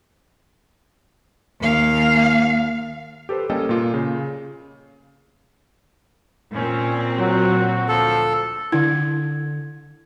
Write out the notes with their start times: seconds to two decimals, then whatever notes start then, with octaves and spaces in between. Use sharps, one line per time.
1.61 D#2 F5
3.29 G4 A4 B4 C5
3.50 G3 A#3 C#4 A4 D#5 G5
3.69 A#2 A#3 F4
3.94 C#3
6.56 A#2 C4 C#4
7.19 F#3 F#4
7.89 D2 F3 A4
8.72 D3 E4 G#6